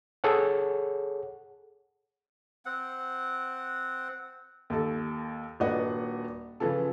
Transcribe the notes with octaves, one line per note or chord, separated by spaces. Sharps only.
G#4 A4 C#5 F#5
C4 F#5
D#2 A4
D#1 D4 F#4 B4 D#5 F#5
C#3 E3 F3 A4